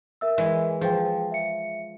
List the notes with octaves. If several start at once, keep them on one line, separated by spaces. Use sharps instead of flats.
A#4 E5 E6
E3 G#3
F3 G#4 G5
E5 C#7